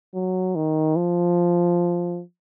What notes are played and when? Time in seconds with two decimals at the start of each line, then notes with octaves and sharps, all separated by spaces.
0.14 F#3
0.56 D#3
0.96 F3